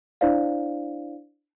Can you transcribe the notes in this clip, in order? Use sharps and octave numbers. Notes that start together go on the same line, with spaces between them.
D4 E4 C5 D5 F5